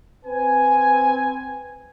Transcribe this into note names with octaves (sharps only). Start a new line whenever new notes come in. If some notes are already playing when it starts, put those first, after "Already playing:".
C4 B4 G#5